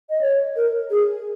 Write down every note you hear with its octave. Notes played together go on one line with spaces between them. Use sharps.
D#5
C#5
A#4
G#4